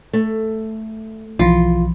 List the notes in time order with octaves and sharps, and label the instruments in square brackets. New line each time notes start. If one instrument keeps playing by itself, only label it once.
[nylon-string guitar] A3
[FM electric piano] B1 E3 F3 [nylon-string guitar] F4